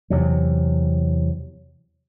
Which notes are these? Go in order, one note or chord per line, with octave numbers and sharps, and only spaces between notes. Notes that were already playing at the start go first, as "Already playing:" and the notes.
E2 C3 F#3